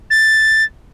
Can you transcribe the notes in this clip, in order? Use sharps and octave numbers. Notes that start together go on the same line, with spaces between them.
A6